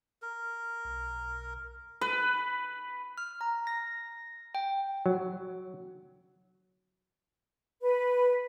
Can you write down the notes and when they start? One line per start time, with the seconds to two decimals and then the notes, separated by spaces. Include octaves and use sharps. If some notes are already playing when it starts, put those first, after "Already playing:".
0.22 A#4
0.85 B1
2.01 B4
3.18 F6
3.41 A#5
3.67 A#6
4.55 G5
5.06 F#3
7.82 B4